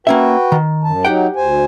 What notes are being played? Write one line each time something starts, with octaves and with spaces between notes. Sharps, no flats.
A#3 C#4 F#4 B4 E5 G5
D#3
F#2 A5
F#3 D#4 G4 F#5 G5
D2 C5 G#5